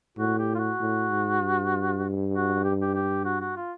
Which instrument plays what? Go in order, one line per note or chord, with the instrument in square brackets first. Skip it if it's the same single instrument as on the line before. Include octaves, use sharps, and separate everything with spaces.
[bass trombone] A2 [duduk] F#4
[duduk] G4
F4
F#4
[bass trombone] A2
G#2
G2
[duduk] F#4
G4
G4
G4
F#4
F#4
F4